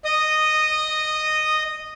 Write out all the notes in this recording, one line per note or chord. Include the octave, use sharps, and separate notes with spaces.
D#5 D#6